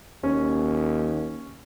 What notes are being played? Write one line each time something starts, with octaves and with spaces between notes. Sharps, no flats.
D#2 C#4